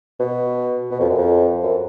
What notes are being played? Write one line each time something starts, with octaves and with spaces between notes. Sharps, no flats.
B2
B2
F2
F#2
F2
F#2